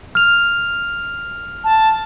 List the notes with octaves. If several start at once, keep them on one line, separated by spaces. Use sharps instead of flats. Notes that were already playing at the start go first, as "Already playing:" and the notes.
F6 F7
A5